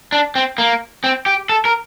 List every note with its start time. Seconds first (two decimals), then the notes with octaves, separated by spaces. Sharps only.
0.12 D4
0.35 C4
0.58 A#3
1.04 C4
1.26 G4
1.49 A4
1.65 A#4